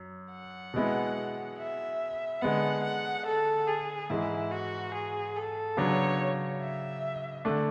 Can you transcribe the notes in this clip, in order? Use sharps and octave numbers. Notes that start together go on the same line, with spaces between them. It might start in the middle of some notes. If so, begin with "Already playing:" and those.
Already playing: F#2
F#5
B2 G#3 B3 E4
E5
D3 G#3 B3 F#5
F#5
A4
G#4
G#2 E3 G#3 E4
F#4
G#4
A4
C#3 F#3 B3 D4 C#5
E5
D3 A3 D4